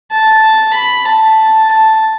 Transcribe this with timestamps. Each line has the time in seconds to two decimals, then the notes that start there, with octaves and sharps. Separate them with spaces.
0.11 A5
0.74 B5
1.05 A5
1.69 A5